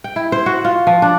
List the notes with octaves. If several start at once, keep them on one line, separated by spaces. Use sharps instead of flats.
G5
E4
C5
F#4
F4
F3
D4